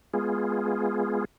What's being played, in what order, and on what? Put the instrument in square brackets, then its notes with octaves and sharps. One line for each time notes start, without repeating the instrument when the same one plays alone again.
[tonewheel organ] G#3 B3 F4 G#4